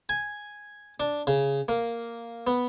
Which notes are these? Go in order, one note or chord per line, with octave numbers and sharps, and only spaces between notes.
G#5
D4
C#3
A#3
B3